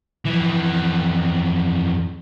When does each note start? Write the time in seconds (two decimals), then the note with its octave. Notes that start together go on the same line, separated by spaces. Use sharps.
0.25 F2 E3